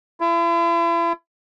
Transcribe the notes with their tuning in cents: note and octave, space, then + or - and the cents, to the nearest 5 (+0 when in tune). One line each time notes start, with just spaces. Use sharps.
E4 +40